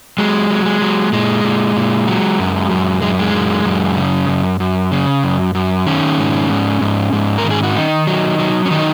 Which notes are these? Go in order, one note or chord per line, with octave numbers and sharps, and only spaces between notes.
F#3 G#3
F#3
G#3
F#3
A#2 G#3
A#2
A#2
F#3
F#2
F#2
F#2 G#3
G#3
F#2
F#2
C#3
F#2
F#2
C#3
F#2
F#2
D#3 C#4
G#2
G#2
G#2
G#2
A#4
D#3
G#4
F#4
D#3 D#4
F#3
F#3
C#4
D#3 D#4